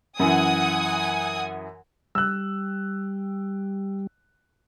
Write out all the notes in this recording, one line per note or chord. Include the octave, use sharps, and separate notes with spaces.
F#2 E3 F#5 G#5 D#6
G3 E6 F#6